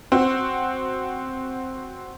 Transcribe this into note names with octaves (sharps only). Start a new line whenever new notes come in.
C4 F#4